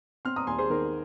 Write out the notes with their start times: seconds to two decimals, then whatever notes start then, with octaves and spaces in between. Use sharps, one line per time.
0.25 C4 C6 F6
0.36 A#5 D#6
0.47 D#2 G#5 C6
0.58 G#4 C5
0.70 D#3 A#4